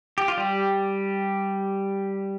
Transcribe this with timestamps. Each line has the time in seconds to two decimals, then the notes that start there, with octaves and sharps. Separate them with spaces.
0.18 G4
0.28 F4
0.37 G3 G4